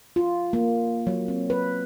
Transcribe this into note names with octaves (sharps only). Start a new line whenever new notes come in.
F4
A#3
F#3
C4
B4